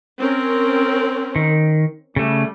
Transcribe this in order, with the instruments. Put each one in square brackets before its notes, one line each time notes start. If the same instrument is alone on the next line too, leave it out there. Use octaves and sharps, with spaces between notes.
[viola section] C4 C#4 A#4
[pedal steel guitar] D#3
[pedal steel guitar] C#3 A3 [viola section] G3